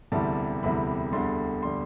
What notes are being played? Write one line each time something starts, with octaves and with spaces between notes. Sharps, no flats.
E1 D2 C3 E3 G3 A5
E1 D2 C3 E3 G3 B5
E1 D2 D3 G3 C6
D3 G3 C6